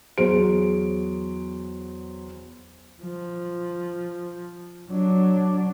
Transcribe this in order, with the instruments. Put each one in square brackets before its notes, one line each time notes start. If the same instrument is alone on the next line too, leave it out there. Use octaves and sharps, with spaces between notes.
[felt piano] E2 F#3 G#4 C5 D7
[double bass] F3
F#3 D4